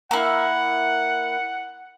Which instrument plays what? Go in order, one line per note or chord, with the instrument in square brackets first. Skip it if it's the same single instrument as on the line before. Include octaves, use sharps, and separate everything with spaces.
[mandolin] A#3 E4 [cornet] F#5